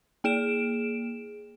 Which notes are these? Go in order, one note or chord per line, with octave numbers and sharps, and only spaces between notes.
A#3 G#4 D7 E7